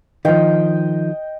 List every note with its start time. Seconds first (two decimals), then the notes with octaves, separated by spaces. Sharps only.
0.25 D#3 F3 D#5 G5